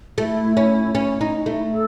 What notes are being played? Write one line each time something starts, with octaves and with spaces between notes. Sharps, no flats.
A3 E4 F#4
C#4 E4
C#4 E4
D#4
A3
A4